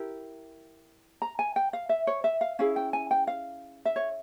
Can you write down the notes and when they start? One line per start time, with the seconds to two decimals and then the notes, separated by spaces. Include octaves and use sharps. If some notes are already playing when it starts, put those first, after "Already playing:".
Already playing: E4 G4 A#4
1.22 A#5
1.39 G#5
1.56 G5
1.73 F5
1.89 E5
2.07 C#5
2.24 E5
2.41 F5
2.59 C#4 E4 G#4 F5
2.76 G5
2.93 G#5
3.11 G5
3.27 F5
3.85 E5
3.96 C#5